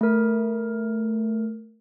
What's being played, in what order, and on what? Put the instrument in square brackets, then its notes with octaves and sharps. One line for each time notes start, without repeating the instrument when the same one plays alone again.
[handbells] A3 A#4